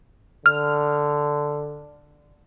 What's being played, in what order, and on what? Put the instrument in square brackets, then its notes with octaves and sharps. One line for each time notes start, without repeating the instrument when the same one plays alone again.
[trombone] D3 [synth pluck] F6